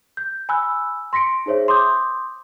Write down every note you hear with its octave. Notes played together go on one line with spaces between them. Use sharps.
G6
G#5 B5 E6 F#6
C6 A#6 B6 C#7 D7
D#4 G#4 C5 C#5 E5
C6 D6 D#6 G6